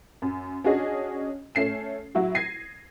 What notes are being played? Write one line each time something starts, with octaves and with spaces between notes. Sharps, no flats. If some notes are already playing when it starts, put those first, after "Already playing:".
F#2
C#4 D4 F#4 G#4 D#5
A3 C#4 C7 E7
F#3 E4 F#4
G#6 A#6 C7 D#7